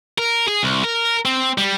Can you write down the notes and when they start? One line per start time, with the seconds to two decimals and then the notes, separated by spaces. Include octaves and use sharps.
0.18 A#4
0.48 G#4
0.63 C2
0.84 A#4
1.25 C4
1.58 G3